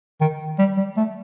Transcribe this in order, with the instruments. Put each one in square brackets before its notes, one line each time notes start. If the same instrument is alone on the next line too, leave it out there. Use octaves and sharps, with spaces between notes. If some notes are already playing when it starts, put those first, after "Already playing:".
[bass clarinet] D#3
G3
G3
A3